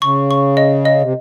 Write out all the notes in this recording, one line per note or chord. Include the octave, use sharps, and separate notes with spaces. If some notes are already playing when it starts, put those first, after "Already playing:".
C#3 C#6
C#6
D#5
D#5
C3